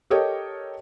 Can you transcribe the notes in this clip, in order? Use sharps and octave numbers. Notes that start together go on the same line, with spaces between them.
G4 A4 A#4 C#5 D#5 G5